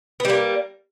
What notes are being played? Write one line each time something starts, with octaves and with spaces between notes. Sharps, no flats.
G3 A#3 B3